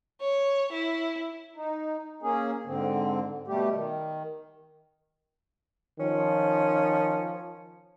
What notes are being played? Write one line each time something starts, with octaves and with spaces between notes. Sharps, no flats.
C#5
E4
D#4
A#3 C#4 G#4
G#2 D3 C4
B2 G3 A3 G4
D#3
D#3 F3 C#4